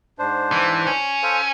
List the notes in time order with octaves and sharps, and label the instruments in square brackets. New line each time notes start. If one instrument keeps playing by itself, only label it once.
[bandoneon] G#2 D4 C5
[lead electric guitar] E3
C#4
[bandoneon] A4 C5 F5